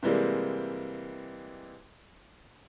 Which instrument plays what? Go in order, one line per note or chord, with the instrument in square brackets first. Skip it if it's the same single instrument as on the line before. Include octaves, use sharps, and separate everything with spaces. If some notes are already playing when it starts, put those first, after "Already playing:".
[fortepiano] C3 E3 G3 G#3 A#3